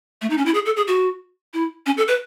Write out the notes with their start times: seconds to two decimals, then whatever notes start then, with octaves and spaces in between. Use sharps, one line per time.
0.22 A3
0.30 D#4
0.38 C#4
0.46 E4
0.54 G#4
0.66 A4
0.77 G#4
0.88 F#4
1.54 E4
1.86 C#4
1.97 A4
2.08 B4